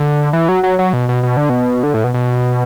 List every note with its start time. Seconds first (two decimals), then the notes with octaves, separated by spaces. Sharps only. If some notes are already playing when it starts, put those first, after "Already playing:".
Already playing: D3
0.33 E3
0.49 F#3
0.63 F#3
0.79 F#3
0.93 B2
1.09 B2
1.23 B2
1.37 D3
1.49 B2
1.83 D3
1.94 A2
2.04 B2
2.14 B2